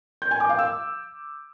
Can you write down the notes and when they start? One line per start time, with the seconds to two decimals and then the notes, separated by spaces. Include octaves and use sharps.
0.22 G6
0.31 G#5
0.40 D6
0.49 F5
0.59 E6